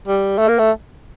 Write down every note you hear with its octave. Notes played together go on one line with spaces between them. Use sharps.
G3
A3
A#3
A3